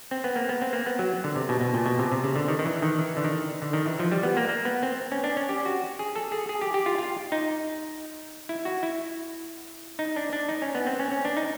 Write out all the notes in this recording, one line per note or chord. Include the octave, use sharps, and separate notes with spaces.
C4
B3
A#3
B3
C4
A#3
B3
F#3
D3
C3
B2
B2
A#2
B2
C3
C3
C#3
D3
D#3
D#3
E3
D#3
E3
D3
D#3
D3
D#3
E3
F3
G3
B3
A#3
A#3
B3
C4
C#4
D4
C#4
G4
F#4
G#4
A4
G#4
G#4
G4
G4
F4
F4
D#4
E4
F#4
E4
D#4
D4
D4
D#4
C#4
B3
C4
C#4
C#4
D4
D#4